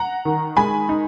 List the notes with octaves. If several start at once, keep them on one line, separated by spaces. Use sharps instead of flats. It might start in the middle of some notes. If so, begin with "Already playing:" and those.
Already playing: F#5 A#5
D#3
G#3 G#5 B5
D#4